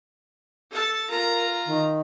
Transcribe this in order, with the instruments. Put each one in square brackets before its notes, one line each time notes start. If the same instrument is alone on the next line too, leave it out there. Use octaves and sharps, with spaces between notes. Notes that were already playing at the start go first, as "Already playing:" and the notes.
[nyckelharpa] A4 A5
[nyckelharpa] F4 A#5 [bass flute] A#4
[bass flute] D#3